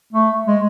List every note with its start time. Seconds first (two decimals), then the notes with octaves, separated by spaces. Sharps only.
0.13 A3
0.47 G#3